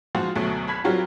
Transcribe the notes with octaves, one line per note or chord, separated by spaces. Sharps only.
F3 G#3 F4 F#4 G#4 C5
D2 B2 F#3 A3
F#1 B5 G#6 B6
F#3 G3 C4 F4 F#4 A#4